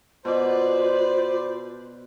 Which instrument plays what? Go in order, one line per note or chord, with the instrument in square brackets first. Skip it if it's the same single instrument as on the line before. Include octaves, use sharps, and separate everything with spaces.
[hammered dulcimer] B2 D6 [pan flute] F4 [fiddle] B4 D5 [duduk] C5